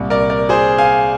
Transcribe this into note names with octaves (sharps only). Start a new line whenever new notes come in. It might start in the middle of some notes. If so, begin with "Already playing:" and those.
Already playing: C2 A#2 G3
A#4 D5
A#4 D5
G#4 C5
F5 G#5